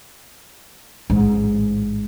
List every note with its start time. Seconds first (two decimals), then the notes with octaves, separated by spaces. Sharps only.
1.10 A1 G#2